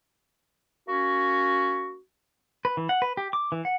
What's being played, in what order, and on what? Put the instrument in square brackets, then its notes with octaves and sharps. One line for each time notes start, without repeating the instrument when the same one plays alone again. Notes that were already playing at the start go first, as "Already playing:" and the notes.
[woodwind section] A#3 C#4 F#4
[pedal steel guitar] B4
E3
F#5
B4
G4
D6
E3
F#5